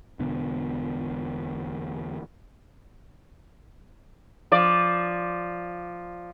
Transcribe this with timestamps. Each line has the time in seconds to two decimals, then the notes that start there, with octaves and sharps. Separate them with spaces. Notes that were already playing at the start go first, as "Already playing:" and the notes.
0.19 E1 B2 D3 B3
4.52 F3 D5